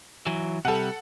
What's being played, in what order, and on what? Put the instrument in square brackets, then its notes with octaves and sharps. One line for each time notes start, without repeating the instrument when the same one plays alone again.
[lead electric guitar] E3 F#3
[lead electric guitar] C3 G3 [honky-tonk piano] A4 F#5